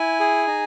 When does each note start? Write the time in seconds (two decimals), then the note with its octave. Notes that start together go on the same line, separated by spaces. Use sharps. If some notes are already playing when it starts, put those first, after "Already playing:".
Already playing: E4 G#5
0.20 G#4
0.47 D#4